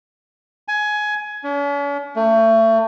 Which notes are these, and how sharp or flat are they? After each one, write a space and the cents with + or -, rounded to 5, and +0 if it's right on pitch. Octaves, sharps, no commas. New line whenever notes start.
G#5 +15
C#4 +45
A3 +30